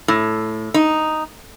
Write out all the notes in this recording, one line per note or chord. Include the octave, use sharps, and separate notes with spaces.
A2
D#4